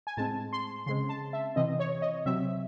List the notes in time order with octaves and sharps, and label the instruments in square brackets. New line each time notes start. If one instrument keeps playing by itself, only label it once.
[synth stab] G#5
A2 G#3 C4 A5
C6
C#3 G#3 C4 C6
A5
E5
C3 E3 C4 D#5
C#5
D#5
C3 F#3 C4 E5